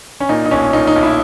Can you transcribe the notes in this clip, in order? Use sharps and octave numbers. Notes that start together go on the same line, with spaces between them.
C#4
A#2 D#4
D#4
B1 C#4
A#2 D#4
D#4
B1
E4